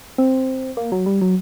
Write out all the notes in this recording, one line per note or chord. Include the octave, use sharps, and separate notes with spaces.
C4
A#3
F#3
G3
F#3